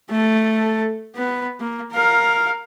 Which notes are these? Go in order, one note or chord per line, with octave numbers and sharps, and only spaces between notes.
A3 A4
B3 B4
A#3
A#4 F5